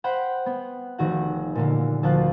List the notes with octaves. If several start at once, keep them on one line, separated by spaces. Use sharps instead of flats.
C5 F#5 G5 B5
B3
F1 D#3 F#4 F#5
A#2 D3 A#3
D2 F3 A#3 F4 F#6